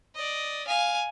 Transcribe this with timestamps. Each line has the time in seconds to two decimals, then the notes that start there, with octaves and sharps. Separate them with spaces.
0.15 D5 D#5
0.67 F5 G#5